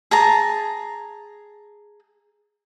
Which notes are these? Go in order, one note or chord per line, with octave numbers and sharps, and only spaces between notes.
G#4 A5 A#5